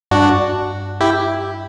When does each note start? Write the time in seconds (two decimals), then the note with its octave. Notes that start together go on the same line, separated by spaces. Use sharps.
0.11 G2 D4 F#4
1.01 E4 G4